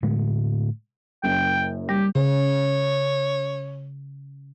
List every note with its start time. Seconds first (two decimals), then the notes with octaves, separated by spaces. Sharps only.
0.03 A2 D3 G#3 A3
1.24 F#1 F#2 G5
1.89 G3 G4
2.15 C#3 C#5